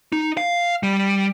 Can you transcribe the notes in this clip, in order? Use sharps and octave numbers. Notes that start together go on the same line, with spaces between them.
D#4
F5
G3